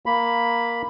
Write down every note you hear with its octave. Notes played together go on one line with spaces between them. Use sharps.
A#3 B5